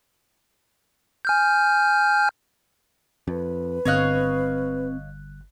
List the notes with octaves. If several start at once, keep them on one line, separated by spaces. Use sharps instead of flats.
G#5 F6 G6
F2 B4
G1 C4 C#5 D#5 F5 F#6